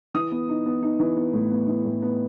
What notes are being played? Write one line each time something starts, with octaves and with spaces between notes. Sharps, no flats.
E3 D#6
B3
D#4
B3
D#4
E3
B3
A2
B3
E3
A2
B3